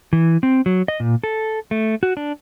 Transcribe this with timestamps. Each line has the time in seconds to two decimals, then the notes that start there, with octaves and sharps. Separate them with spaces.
0.13 E3
0.43 C4
0.66 F#3
0.88 D#5
1.00 A#2
1.24 A4
1.71 A3
2.03 F#4
2.17 D4